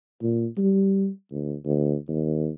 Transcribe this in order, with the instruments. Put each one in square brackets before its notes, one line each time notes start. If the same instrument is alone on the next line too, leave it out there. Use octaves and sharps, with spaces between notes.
[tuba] A#2
G3
D2
D2
D#2